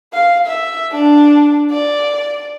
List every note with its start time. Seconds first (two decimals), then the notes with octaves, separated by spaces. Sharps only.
0.13 F5
0.46 E5
0.92 D4
1.71 D5